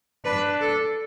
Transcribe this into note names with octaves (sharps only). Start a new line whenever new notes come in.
D4 B4
A4